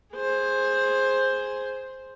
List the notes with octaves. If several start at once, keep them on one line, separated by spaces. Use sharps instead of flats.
G#4 C5